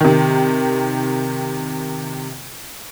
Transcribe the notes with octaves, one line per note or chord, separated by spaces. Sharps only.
C3 D#3